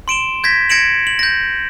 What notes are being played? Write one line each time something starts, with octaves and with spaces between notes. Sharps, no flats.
C6 D7 E7 G7
G6 G#6 A#6 B6
G#6 A#6 C#7 D7 E7 F#7
F#7
G6 A#6